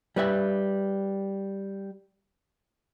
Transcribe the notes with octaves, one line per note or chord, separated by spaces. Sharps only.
G3 B4 E5